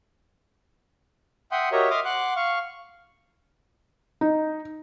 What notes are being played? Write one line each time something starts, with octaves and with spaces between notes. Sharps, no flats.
E5 F#5 G5 C6 D#6
F#4 G4 A#4 C#5 D#5 E5
D#5 E5 C6 D6 D#6 F6
F#5 C6 D6 F#6
F5 C#6
D#4